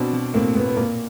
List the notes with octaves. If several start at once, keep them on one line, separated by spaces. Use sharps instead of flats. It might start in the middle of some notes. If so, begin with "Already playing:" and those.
Already playing: B2 C4 D4
B2
A2 A#3 C4
A2 B3
B3
A#2 A#3